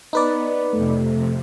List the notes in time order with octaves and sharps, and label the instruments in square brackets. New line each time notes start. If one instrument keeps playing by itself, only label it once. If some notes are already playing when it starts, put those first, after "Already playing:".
[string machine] B3 [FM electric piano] D#4 B4 D5
[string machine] F2 C3 [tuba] A3